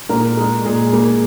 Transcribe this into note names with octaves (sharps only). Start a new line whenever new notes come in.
A#2 A#4
G#3
A#2 G#4
A#3